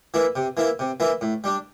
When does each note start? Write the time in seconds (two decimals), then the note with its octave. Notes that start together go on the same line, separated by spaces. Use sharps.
0.14 E3 A#3 E4
0.36 C3
0.57 E3 A#3 E4
0.79 C3
1.00 E3 A#3 E4
1.21 A2
1.44 G3 D4